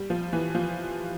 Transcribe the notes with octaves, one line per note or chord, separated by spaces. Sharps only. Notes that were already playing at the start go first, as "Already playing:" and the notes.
Already playing: G3
F3
E3
F3